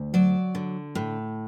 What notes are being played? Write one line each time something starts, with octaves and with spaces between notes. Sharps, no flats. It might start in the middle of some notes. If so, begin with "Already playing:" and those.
Already playing: D2
F#3 D5
D3
A2